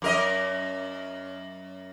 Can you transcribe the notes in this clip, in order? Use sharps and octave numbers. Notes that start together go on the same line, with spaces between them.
F#2 A#4 D#5